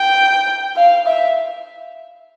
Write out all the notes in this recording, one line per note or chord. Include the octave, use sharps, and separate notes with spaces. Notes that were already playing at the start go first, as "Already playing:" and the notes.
Already playing: G5
F5
E5